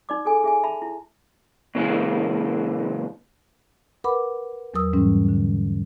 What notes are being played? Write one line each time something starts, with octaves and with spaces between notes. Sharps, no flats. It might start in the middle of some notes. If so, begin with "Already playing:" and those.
D#4 D5 D6
G#4 A4 G#5
G#4 E5 G#5
E5 A5 B5
E4
A#2 C#3 E3 G#3
A#4 B4 F#5 B5 D6
E2 F#3 A#4 D#6 E6
G#2 E3 G3 C#4
D3